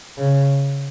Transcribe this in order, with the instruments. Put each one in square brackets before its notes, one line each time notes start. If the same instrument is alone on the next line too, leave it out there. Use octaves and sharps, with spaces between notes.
[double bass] C#3